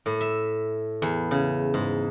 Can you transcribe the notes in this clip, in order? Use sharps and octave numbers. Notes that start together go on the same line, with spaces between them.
A2
E5
E2
C#3
G#2